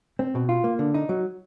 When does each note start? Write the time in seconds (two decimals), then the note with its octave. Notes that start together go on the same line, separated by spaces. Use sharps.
0.19 C4
0.35 B2
0.49 F4
0.64 A#3
0.79 D3
0.94 D#4
1.09 F#3